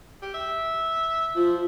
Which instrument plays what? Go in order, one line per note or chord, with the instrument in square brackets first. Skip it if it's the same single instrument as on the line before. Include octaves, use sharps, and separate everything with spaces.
[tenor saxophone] G4
E5
[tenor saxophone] F3 [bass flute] F4